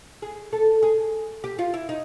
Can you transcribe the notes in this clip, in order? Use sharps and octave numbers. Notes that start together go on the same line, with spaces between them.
G#4
A4
G#4
G4
F4
E4
D#4